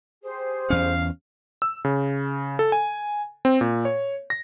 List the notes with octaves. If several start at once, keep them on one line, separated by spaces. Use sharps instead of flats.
G4 G#4 C5
E2 C#4 F5
E6
C#3
A4
G#5
C4
A#2
C#5
A#6